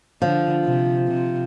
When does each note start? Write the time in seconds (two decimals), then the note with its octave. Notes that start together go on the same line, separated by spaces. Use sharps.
0.22 D3 F3
0.64 C3
1.07 C3